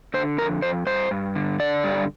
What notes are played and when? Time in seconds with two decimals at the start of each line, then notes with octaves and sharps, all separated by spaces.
0.14 D3 C5
0.38 F2 A#4
0.62 F2 C5
0.86 G2 C5
1.11 G2
1.35 D3
1.60 D3 D5
1.84 G2